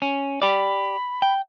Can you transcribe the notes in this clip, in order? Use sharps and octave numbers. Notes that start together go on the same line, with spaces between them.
C#4
G4 D5 B5
G5